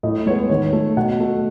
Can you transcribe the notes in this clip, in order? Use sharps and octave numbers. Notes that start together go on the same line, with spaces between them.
A2 D#5
G#3 B3 C#5
D#3 C#5
A3
B2 F#5
A3